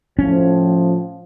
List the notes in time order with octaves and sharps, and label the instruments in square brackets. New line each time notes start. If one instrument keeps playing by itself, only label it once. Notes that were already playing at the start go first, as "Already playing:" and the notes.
[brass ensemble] A2 F3 [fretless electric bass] C#4